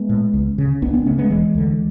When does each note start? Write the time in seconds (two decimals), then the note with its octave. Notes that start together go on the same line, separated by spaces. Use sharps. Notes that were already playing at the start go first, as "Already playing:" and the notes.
Already playing: G#3 B3
0.09 A2
0.34 C#2
0.58 C#3
0.82 C#2 B3 D4
0.94 B3 D4
1.06 C#3 A3 C#4
1.18 G#3 B3
1.30 E1 E3 G#3
1.55 D2 D3